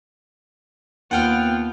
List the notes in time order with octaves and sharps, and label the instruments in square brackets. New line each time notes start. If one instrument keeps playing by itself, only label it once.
[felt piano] D#2 [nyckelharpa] B3 F4 [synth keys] F#5 G5 F6